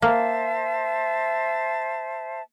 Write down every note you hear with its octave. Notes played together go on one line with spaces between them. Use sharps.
A#3 C5 E5 A5